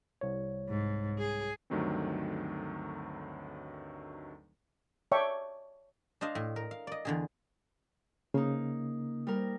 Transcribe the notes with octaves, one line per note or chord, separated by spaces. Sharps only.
C2 C#5
G#2
G#4
D2 G2 D#3 F#3 A3 C4
C#5 D5 E5 G5 A5 C#6
D4 C5 D#5 F5
A2
A#4
F5
D5 D#5
E2 D3 G#4
C#3 A#3 D#4
G3 A#4